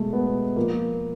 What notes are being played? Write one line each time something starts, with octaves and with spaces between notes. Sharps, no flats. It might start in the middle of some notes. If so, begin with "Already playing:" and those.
Already playing: B2 G#3 A3
B3
A#2 F3 A#3